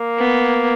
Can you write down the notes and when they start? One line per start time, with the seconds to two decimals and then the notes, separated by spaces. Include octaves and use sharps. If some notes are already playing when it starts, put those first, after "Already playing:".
Already playing: A#3
0.18 B3